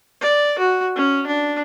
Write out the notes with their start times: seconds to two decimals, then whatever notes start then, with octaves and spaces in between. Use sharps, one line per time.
0.21 D5
0.58 F#4
0.95 C#4
1.26 D4